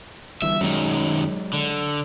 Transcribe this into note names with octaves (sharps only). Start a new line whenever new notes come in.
G1 G2 E3 E5
F#2 D#3 F#3 G#3
D3